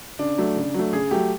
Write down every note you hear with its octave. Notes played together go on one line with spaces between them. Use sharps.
C#3 D4
F#3 A3
C#3
F#3 A3
C#3 G#4
F#3 A3 G4